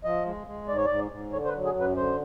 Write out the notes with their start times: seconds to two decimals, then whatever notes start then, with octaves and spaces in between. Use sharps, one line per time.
0.04 F3 D#5
0.26 G#3
0.47 G#3
0.68 G#2 D5
0.77 C#5
0.86 G#2 D5
1.12 G#2
1.32 D3 C#5
1.45 C5
1.49 B4
1.54 F#3
1.65 G#4
1.75 F#2
1.80 B4
1.97 D3 C5